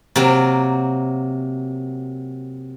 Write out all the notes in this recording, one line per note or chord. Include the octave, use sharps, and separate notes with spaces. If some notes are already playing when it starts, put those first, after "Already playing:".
C3 F#3 A#3